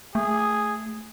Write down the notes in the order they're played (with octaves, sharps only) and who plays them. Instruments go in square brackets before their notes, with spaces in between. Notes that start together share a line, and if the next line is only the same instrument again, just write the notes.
[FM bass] A3 [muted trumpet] G#4